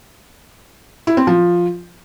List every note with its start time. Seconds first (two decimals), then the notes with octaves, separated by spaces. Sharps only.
1.07 E4
1.17 C4
1.27 F3